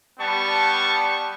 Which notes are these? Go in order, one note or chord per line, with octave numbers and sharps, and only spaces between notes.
G3 B3 A5 C#6